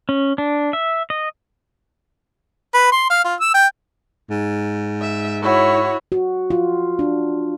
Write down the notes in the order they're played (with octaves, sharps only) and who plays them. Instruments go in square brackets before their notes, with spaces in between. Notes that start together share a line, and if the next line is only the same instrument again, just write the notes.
[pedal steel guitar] C#4
D4
E5
D#5
[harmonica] B4
C6
F5
F4
E6
G5
[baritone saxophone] G#2
[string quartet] E5
E4 F#4 C#5
[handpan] F#4
F4
D4